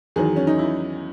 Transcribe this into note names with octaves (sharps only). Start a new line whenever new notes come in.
E2 D#3 F#3 G#4
C#4
D#4
E4